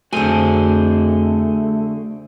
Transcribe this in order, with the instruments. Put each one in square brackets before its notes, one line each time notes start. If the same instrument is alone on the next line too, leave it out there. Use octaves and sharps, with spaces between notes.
[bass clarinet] F2 [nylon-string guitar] D3 G#5 [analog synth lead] A3 [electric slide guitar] F#4 G#4 C5